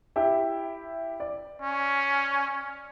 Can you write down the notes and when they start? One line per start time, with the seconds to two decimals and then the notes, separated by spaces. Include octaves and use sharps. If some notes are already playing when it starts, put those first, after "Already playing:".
0.16 E4 G4 E5
1.20 D5
1.62 C#4